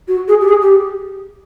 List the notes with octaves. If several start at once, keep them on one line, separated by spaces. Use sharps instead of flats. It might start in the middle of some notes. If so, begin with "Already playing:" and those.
F#4
G#4
G4
G#4
G4